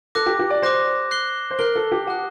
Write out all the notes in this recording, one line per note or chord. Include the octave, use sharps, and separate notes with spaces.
A4 D6 F#6 A#6
G4
G4
D5
C5 D6 F#6 A#6
F#6 C7 G7
C5
A#4 F#6 C7 G7
A4
G4
F#5 A5 D#6 F#6